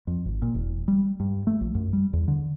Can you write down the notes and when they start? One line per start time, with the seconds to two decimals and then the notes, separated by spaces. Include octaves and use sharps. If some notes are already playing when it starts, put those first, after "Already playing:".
0.07 F2
0.26 G#1
0.42 A#2
0.54 E1
0.88 G3
1.20 G2
1.47 A3
1.61 A#1
1.75 F#2
1.93 G3
2.13 E2
2.28 D3